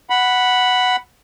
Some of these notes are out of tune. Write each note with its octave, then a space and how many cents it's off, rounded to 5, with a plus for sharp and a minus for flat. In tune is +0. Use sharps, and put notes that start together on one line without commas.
F#5 +0 B5 +0